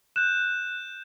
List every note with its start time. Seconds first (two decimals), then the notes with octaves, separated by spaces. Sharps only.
0.16 F#6 G6 E7